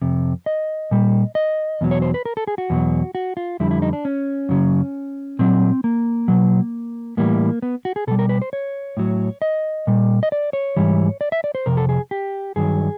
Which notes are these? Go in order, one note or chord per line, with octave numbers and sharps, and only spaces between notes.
F2 C3
D#5
A#2 G3
D#5
E2 B2 F#3
C#5
C5
B4
A#4
A4
G#4
F#4
E2 B2 F#3
F#4
F4
F2 D3 G3 E4
E4
D#4
D4
C#4
F#2 C#3 F#3
A#2 F#3 C4
A#3
B2 F#3
A2 E3 G3 A#3
B3
F#4
G#4
B2 G3 A4
A#4
B4
C5
C#5
A2 F#3
D#5
A#2 G3
D#5
D5
C#5
G#2 E3 G3
D5
E5
D5
C5
F2 C3 A#4
A4
G#4
G4
G2 D#3 F#3 G#4